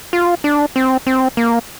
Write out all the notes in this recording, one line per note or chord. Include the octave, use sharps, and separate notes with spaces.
F4
D4
C4
C4
A#3